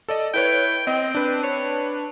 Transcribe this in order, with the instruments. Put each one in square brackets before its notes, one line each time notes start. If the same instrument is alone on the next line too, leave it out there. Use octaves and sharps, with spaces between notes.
[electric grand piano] A4 D5 D#5
[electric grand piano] E4 B4 C#5 [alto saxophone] G5
[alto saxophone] C4 [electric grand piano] D#5
[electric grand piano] D4 B4
[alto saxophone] C#5